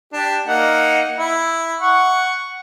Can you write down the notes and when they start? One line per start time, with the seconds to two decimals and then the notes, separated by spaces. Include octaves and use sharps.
0.13 D4 G4
0.47 A#3 D#4 F#5
1.17 E4
1.81 F#5 C#6